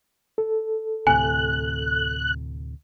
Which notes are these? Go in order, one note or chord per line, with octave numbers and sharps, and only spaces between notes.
A4
D2 A2 C3 G#5 F#6